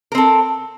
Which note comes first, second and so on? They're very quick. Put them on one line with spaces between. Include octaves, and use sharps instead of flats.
A#4 C4 A4